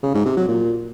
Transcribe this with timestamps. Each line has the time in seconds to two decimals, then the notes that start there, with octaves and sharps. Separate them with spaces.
0.03 C#3
0.14 G#2
0.26 C3
0.37 F#3
0.48 A#2